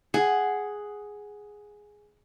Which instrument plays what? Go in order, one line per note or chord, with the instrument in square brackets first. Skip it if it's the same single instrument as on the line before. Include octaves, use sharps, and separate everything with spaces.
[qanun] G#4 [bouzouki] F#5